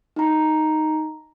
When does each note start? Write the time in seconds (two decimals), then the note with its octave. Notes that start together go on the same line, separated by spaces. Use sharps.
0.16 D#4 A#5